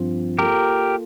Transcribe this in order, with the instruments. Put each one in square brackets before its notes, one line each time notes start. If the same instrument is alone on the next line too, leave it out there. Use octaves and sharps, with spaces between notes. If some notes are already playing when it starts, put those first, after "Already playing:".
Already playing: [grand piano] G2 F3 C4 F4 C5
[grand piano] A#3 F4 A4 [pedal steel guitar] G4 A#4